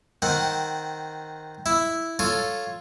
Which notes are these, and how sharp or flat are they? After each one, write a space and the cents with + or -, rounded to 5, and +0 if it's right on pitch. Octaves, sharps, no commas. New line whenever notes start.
D#3 +0 C4 +0 F#5 +0
E4 +0 E5 +0
F4 +0 A4 +0 C#5 +0